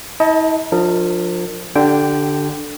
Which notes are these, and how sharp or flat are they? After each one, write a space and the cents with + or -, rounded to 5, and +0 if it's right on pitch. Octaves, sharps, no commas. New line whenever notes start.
E4 -45 D#5 +25 A5 +10
F3 +25 D4 +35 A#4 -20
D3 +0 G4 -20 G5 +0